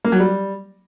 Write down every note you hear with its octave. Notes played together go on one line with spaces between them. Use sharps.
A#3
F#3
G3